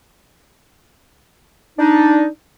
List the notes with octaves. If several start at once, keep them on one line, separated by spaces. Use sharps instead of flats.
D4 D#4